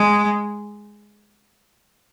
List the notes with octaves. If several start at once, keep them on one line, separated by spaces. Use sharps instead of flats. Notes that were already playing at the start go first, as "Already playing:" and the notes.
Already playing: G#3